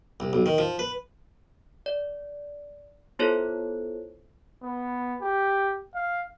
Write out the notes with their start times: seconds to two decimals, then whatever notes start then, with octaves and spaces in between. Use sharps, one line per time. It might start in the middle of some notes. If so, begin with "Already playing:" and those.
0.20 C2
0.33 B1
0.46 D#3
0.58 F3
0.79 B4
1.86 D5
3.19 B3 E4 F4 A4 C5 C#5
4.63 B3
5.22 G4
5.95 F5